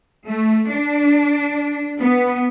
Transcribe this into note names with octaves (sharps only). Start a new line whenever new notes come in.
A3
D4
B3